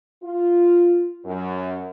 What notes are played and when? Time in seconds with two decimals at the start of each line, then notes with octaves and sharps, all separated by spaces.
0.23 F4
1.25 F#2